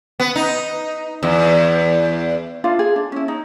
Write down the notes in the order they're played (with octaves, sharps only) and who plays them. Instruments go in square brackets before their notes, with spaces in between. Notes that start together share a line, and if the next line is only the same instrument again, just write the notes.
[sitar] B3
D#4
E2
[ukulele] D4 E4 F4 F5
G#4
D4
C#4 E4
D#4